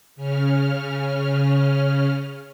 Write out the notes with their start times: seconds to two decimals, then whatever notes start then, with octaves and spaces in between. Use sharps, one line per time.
0.16 C#3 C#4 F6